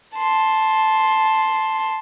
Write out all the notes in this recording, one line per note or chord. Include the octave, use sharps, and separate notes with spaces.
A5 C6